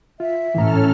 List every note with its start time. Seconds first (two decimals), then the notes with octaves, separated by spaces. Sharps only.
0.20 F4 E5
0.55 A2 E3 C#4 A4 A#5 F6